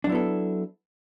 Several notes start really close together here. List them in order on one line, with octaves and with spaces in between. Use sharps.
D4 F#3 E4 B3 A4